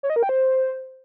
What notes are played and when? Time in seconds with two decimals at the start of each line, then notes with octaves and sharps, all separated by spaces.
0.03 C#5
0.10 D#5
0.16 A#4
0.23 G5
0.29 C5